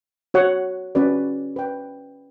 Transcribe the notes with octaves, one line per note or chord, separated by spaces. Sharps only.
F#4 C#5 F#5
C#4 F#4 B4 D5
B4 D5 G5